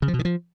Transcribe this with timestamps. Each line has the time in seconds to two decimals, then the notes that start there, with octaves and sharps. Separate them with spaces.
0.02 C#3
0.08 F3
0.14 B2
0.19 D#3
0.25 F3